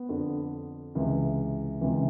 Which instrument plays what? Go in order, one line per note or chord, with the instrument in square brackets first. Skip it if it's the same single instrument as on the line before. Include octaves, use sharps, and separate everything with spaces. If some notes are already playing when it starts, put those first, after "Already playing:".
Already playing: [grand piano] B3
F2 D3
C#2 C3 E3
C#2 C3 E3 C4